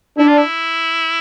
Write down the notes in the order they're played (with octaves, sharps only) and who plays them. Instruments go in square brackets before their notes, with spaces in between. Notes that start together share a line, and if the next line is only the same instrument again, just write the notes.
[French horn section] D4 [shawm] E4
[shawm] F4
E4